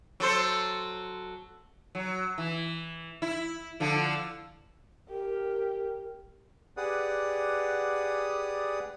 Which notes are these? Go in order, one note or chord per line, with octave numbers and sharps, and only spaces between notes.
F#3 A4 C5
F#3
E3
E4
D3 F3
G4 A#4
G4 G#4 B4 D5 F#5 D#6